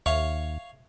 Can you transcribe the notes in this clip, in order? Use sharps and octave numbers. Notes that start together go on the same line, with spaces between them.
D#2 C#5 E5 F5 C#6